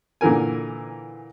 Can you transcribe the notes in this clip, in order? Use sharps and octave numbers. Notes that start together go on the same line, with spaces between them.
A#2 D3 E3 A#4 G#5